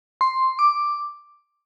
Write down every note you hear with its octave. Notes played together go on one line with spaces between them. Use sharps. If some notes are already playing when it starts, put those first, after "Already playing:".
C6
D6